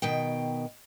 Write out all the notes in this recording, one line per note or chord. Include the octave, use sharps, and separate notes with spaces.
B2 D#3 G5